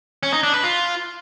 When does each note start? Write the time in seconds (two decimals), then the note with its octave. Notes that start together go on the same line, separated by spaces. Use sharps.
0.23 C#4
0.33 D#4
0.43 D4
0.53 B4
0.64 F4